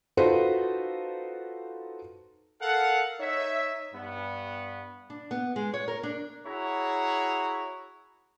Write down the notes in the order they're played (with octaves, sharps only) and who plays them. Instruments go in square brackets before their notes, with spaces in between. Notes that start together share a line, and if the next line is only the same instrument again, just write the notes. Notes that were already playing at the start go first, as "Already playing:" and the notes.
[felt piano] D#4 F4 F#4 A4 B4 C5
[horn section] A4 A#4 F5 F#5
D#4 C#5 E5
G2 B3
[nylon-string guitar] D4
B3
G#3
C#5
A#4
D4
[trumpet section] E4 F#4 G#4 C#5 A#5